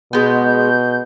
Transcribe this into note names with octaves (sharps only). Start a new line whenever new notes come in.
B2 G#3 B3 G6